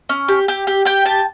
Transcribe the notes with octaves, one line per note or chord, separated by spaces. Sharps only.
C#4
G4
G4
G4
G4 G5
G4 A5